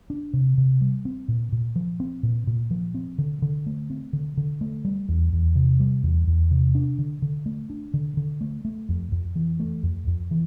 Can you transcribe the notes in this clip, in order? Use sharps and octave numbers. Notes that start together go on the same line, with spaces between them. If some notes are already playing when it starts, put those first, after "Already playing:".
D4
C3
C3
G3
C4
A#2
A#2
F3
C4
A#2
A#2
F3
C4
D3
D3
A3
C4
D3
D3
A3
G3
E2
E2
C3
G3
E2
E2
C3
D4
D3
D3
A3
D4
D3
D3
A3
A3
F2
F2
E3
A3
F2
F2
E3